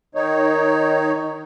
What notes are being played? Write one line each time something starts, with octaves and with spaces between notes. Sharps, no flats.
D#3 D#4 C#5